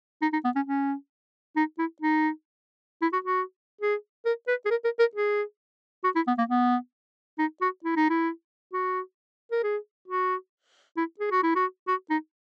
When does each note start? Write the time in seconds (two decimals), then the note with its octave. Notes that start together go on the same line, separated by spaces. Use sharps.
0.22 D#4
0.33 D#4
0.44 B3
0.56 C#4
0.67 C#4
1.56 D#4
1.78 E4
2.02 D#4
3.02 E4
3.13 F#4
3.24 F#4
3.81 G#4
4.25 A#4
4.47 B4
4.66 G#4
4.71 A#4
4.84 A#4
4.99 A#4
5.15 G#4
6.04 F#4
6.16 E4
6.27 B3
6.38 A#3
6.49 B3
7.39 D#4
7.61 F#4
7.84 E4
7.96 D#4
8.10 E4
8.73 F#4
9.51 A#4
9.63 G#4
10.08 F#4
10.97 E4
11.20 G#4
11.31 F#4
11.43 E4
11.55 F#4
11.88 F#4
12.10 D#4